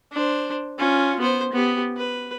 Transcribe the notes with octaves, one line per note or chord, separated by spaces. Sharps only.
D4 C5
C#4 F4
B3 C5
B3 G4
B4